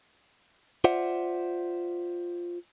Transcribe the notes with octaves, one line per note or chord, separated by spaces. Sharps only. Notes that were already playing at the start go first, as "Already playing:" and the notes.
F4 C5 D5 E5 F#5